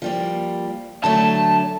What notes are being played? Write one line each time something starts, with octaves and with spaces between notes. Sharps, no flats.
F3 G3 A#3
D3 F#3 A3 A5